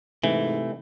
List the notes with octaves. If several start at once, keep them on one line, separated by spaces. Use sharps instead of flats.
G#2 C3 E3 A3